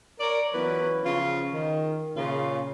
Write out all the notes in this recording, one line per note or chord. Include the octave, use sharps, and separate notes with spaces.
A#4 C#5 D5
E3 F#3 B3 C#4 F4 B4
C#3 F3 F4
D#3
A#2 C#3 F4